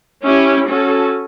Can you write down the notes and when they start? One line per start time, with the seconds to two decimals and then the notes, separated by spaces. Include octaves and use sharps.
0.23 C#4 E4 G4
0.67 C#4 F#4 A4